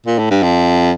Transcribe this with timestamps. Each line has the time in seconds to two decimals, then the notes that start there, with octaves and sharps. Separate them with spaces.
0.06 A#2
0.19 A2
0.30 G2
0.43 F2